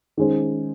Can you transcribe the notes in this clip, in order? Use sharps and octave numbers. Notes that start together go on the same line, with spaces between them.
D#3 G#3 C#4 G#4 C5